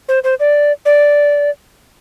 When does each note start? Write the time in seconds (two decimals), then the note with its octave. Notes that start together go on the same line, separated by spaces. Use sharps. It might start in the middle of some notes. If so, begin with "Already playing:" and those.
0.09 C5
0.24 C5
0.40 D5
0.86 D5